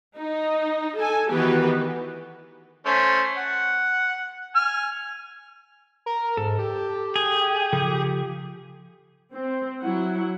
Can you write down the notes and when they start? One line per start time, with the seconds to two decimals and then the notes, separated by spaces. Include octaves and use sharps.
0.18 D#4
0.97 A4 G#5
1.30 D#3 E3 B3 F#4 G4 B4
2.86 A3 C#4 C5
3.37 F#5
4.55 G#5 F6
6.06 A#4
6.37 G#2 A4
6.58 G4
7.16 G#4
7.73 C#3 F3 A4
9.33 C4
9.81 F#3 E4 F#5